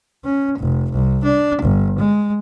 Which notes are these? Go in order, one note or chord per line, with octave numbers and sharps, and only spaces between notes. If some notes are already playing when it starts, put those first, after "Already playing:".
C#4
F1
C2
D4
G1
G#3